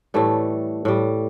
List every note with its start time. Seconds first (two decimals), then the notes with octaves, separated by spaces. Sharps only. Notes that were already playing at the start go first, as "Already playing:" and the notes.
0.14 A2 E3 G3 A3
0.85 A2 G3